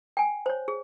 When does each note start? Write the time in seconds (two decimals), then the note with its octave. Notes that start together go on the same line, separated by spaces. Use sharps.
0.17 G5 G#5
0.46 C5 C#5
0.68 G#4